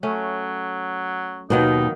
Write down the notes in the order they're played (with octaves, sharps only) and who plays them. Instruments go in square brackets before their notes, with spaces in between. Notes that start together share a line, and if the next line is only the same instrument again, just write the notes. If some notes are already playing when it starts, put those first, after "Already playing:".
[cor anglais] F#3 [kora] A3 C#4
[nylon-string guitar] D#2 G#2 B2 [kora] D#3 F#3 A#3 [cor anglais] D#4